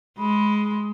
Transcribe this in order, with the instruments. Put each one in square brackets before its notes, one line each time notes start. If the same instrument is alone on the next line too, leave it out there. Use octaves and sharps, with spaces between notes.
[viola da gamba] G#3 [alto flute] B5